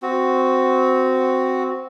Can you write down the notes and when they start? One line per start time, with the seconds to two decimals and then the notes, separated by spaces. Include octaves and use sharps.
0.02 C4 F#4